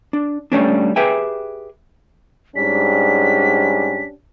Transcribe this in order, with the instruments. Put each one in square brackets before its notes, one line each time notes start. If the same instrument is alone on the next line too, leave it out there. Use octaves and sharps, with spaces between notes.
[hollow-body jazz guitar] D4
G3 A3 C#4 D4
G4 G#4 B4 E5 G5 G#5
[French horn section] G#2 G3 [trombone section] C#4 D4 G4 [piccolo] B6